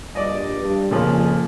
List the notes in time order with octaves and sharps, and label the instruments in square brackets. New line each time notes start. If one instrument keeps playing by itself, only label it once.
[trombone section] A#1 G2 [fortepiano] D5 D#5
[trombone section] G2
[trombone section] F2 C#3 [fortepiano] A#2 F3 C#4